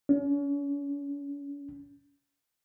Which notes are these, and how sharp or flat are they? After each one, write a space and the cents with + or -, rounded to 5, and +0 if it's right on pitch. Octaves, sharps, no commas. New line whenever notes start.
C#4 +40